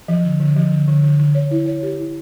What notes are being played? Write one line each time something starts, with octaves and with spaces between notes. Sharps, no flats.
F3
D3
D3
F3
D3
D3
D3
D3
C#5
E4
C#5
G4
E4